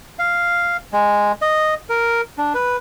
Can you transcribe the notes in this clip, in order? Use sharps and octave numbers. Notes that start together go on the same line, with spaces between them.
F5
G#3
D#5
A#4
D4
B4